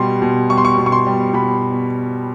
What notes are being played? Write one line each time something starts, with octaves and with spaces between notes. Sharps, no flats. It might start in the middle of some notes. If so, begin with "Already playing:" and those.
Already playing: B2 G3 C6
B2
G3 C#6
C6
C#6
B2
C#6
C6
G3
B2 B5